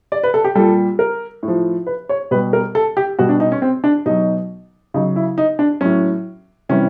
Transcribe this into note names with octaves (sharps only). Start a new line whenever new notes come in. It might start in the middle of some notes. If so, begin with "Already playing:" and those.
D5
B4
A4
G4
A#2 G3 A4
A#4
A2
F3
B4
C#5
B2 G3 B4
A#4
A4
G4
B2 G3 F#4
D4
D#4
C#4
C4
D4
B2 F#3 D#4
C#3 F#3 D#4
E4
D#4
D4
A2 F#3 C#4
C3 E3 G3 C#4